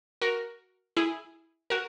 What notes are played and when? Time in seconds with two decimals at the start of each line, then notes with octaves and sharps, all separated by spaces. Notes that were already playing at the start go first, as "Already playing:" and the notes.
0.21 F#4 A#4
0.97 E4 G#4
1.70 F#4 A#4